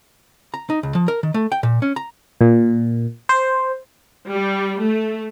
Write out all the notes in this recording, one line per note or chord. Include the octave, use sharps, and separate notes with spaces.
A#5
D#4
C#2
F3
A#4
D#3
A3
G5
A#2
C#4
A#5
A#2
C5
G3
A3